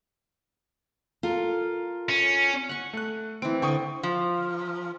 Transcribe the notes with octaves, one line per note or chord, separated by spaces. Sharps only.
F4 A4 A#4
C#4
F#5 C#6
A3 F#6
E3 C4 D7
D3 G5 C#6 D#6
F3